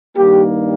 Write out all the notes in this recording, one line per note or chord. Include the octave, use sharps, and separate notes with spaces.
G2 D#3 G3 A#3 G4